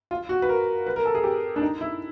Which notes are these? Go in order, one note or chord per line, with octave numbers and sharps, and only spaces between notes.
F4
F#4
B4
A#4
B4
A#4
A4
G#4
G4
D4
D#4
E4